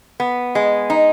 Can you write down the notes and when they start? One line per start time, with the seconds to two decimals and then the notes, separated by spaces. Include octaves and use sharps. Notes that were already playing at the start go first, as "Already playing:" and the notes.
0.20 B3
0.55 G#3
0.90 D#4